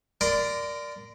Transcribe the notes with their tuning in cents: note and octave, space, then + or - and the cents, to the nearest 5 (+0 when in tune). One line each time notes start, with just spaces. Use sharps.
A#4 +0 D5 +0 C6 -35